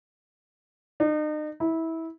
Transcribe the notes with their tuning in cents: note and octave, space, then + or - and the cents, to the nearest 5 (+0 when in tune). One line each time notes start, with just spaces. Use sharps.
D#4 -40
E4 -20